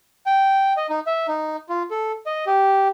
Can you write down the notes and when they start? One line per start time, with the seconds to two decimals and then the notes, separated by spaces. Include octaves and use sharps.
0.26 G5
0.77 D#5
0.89 D#4
1.07 E5
1.28 D#4
1.69 F4
1.91 A4
2.26 D#5
2.46 G4